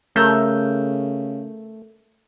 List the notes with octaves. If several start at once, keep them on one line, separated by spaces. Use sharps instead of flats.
C#3 A3 A#4 E6 G6